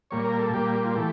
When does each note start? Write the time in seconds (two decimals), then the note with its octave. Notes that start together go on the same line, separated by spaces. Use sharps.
0.11 A#2 G3 A#3 C#5
0.25 A#4
0.39 A4
0.53 A#2 G3 A#3 G4
0.74 G4
0.85 F4
0.95 E3 A3 G4